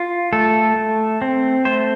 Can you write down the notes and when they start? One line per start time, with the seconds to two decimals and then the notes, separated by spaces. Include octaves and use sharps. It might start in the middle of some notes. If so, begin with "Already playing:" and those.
Already playing: F4
0.33 A3 A4
0.76 A3
1.22 C4
1.65 A3 C5